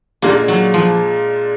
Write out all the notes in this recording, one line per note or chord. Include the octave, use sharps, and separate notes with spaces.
A#2 G#3 A#3 D4 F4
F#3
F3